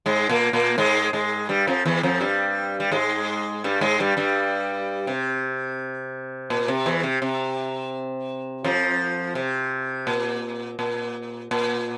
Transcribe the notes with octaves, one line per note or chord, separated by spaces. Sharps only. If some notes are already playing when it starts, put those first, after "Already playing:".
G#2 G#3
A#2 A#3
A#2 A#3
G#2 G#3
G#2 G#3
G2 G3
F2 F3
E2 E3
F2 F3
G2 G3
G3
G#2 G#3
G2 G3
G#2 G#3
G2 G3
G2 G3
C3
A#2
C3
E2 E3
C3
C3
F2 F3
C3
A#2
A#2
A#2